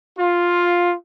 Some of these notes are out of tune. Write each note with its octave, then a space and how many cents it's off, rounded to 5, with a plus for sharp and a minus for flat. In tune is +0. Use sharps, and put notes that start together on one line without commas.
F4 +5